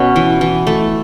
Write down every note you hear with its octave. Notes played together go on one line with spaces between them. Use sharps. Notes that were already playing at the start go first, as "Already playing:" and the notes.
Already playing: B2 C#4
E3
E3
A3